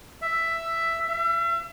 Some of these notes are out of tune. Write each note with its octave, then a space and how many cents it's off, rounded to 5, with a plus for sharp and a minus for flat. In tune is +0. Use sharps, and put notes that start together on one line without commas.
E5 +10
E5 +40